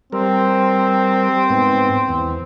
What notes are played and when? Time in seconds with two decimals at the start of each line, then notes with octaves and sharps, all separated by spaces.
0.12 G3 C4 A#4
1.50 G#2 B3
2.09 E2